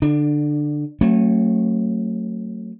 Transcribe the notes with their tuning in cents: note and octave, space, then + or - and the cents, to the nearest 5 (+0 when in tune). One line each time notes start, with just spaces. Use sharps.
D3 +0 D4 +20
F#3 +5 A3 +30 C#4 -30